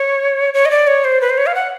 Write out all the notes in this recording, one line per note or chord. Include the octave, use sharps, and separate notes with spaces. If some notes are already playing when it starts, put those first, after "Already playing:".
Already playing: C#5
C#5
D#5
D5
C#5
C5
B4
C5
C#5
F5
F#5